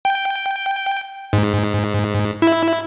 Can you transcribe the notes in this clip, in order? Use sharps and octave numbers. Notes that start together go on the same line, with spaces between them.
G5
G#2
E4